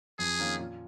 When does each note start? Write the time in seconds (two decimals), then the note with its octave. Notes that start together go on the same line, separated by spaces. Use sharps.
0.19 F2 G#4
0.39 D#3 A#3 C#4 F4
0.60 A#2